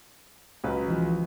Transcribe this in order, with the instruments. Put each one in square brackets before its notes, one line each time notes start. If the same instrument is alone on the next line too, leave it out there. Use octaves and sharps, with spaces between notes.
[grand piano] C#2 F#3 B4
[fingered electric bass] E3 F3